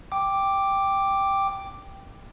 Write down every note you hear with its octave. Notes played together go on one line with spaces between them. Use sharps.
G5 D6